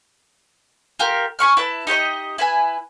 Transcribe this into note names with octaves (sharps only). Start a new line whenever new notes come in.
F4 G4 A#4
G#5 B5 C#6 F6
E4 B4 A5
D#4 G4 C5 D#5
E4 B4 G#5